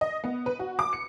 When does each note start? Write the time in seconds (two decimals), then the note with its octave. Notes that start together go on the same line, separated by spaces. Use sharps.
0.01 D#5
0.24 B3
0.46 B4
0.59 F#4
0.79 D6
0.93 C#7